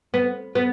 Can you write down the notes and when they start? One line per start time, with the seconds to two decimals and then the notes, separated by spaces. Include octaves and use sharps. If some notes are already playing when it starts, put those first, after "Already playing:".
0.14 B3
0.55 B3